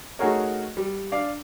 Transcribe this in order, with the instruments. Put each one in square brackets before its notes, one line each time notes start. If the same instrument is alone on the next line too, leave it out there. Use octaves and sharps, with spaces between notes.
[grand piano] A3 D#4 F#4 G#4 A#4 C#5
G3
D4 D5 F5